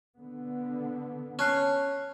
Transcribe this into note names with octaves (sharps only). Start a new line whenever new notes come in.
D3 B3
C#4 A5 F#6 C7